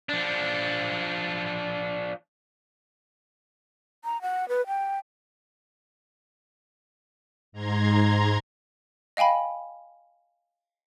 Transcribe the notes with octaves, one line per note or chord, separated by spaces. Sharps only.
F3 D4
A#5
F#5
B4
G5
G#2 A#5 C6 G#6
D#5 F5 G5 G#5 B5